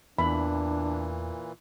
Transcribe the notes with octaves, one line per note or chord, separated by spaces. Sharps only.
E2 A#2 E3 D4 B5